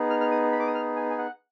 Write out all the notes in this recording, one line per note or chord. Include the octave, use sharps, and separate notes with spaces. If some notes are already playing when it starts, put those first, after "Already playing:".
Already playing: B3 D#4 G#4
F6
F6
D#6
B5
D6
D#6
F6
G#5
G#5
F#5